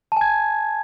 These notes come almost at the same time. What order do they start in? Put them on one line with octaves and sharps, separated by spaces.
A5 G#5 G#6